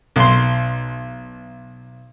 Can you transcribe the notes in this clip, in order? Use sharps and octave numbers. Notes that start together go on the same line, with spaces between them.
B1 C6